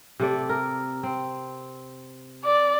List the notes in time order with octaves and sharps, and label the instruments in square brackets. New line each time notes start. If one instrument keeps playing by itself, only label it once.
[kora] C3 A3 D5
A#4
C4
[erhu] D5